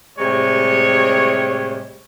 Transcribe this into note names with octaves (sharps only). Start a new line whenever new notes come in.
A2 C3 G3 G#3 C#5